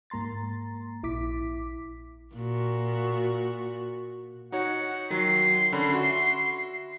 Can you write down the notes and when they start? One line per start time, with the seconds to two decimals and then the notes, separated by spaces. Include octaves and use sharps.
0.10 G#2 A#3 A#5 C6 A6
1.03 A#1 E4 D6 B6
2.35 A#2 F#4
4.52 D#4 F#4 C#5 F#5
5.10 D#3 F#3 C6
5.72 D3 C#4 B5
5.93 F#4 E5